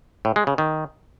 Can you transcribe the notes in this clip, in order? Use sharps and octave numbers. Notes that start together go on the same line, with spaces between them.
A2
G#3
C#3
D#3